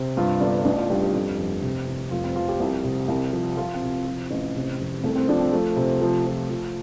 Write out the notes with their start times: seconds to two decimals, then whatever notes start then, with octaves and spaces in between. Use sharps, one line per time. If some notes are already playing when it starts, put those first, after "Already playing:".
Already playing: C3
0.17 G2 F4
0.41 G1 D4
0.65 A1 D4
0.78 F4
0.90 G2 G4
1.01 G4
1.14 F2 G4
1.38 F1
1.62 C3
1.87 C2
2.11 F1 F4
2.24 C4
2.36 F3 F4
2.48 G4
2.60 C2
2.84 C3
3.08 C2
3.33 F3
3.57 F3 F4
3.74 C4
3.82 C3
4.07 F3
4.31 A1
4.56 C3
4.79 F1
5.04 C2 A3
5.15 C4
5.28 F3 D4
5.41 C4
5.53 F3 A3
5.76 C3
6.02 F3
6.26 F3
6.49 F3